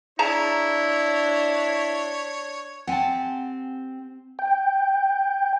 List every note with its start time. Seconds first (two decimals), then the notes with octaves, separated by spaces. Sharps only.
0.19 D4 E4 G#4 C#5 A5 A#5
2.87 C4 G4 F#5 G#5 A5
4.39 G5